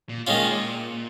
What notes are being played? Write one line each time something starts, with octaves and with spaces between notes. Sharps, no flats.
A#2
A#2 D#3 G#3 C#4 F4